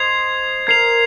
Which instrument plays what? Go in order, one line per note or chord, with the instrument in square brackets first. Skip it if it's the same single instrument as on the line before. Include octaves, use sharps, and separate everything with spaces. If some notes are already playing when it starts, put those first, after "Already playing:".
Already playing: [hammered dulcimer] C5 D#5 [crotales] G#6 C7 F7
[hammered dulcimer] A#4 [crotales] G#6 C7 F7